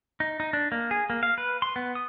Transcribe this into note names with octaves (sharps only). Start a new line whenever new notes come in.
D#4
D#4
D4
A#3
G#4
A#3
F5
B4
C6
B3
D#6